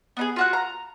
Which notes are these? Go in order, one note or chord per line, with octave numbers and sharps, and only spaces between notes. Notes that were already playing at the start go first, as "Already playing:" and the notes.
B3 D#4 G#4
F4 F#4 F#6
A#5